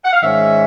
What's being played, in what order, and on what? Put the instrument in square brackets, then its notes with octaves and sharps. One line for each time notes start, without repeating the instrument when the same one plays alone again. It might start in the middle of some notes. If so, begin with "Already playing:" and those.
[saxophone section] F#5
F5
G#2 D#3 G#3 C#4 E5